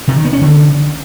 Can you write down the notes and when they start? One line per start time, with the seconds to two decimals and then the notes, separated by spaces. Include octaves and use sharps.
0.08 C3
0.16 D#3
0.25 B3
0.33 C#4
0.41 D3